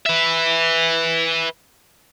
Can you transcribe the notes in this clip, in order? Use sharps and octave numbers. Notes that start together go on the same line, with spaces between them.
B4 E5